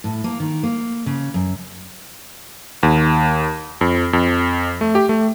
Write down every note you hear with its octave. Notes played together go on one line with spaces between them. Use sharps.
A2
A#3
D#3
A#3
C#3
F#2
D#2
F2
F2
A3
G4
A3